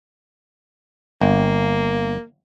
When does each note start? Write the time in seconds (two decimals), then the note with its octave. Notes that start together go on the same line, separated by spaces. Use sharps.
1.21 G1 A#3